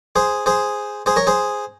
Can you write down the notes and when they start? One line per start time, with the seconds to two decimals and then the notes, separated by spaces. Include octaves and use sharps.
0.16 G#4 C5
0.46 G#4 C5
1.06 G#4 C5
1.16 A#4 C#5
1.27 G#4 C5